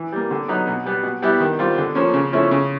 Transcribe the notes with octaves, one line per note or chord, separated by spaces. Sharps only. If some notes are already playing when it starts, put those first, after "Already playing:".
Already playing: E3
G3 A#3
D3
F#3 B3 D#4
B2
G3 B3
B2
G3 B3 E4 G4
D#3
G3 C4 F4
D3
F3 A#3 C#4
C#3
F3 A3 C#4 E4
C#3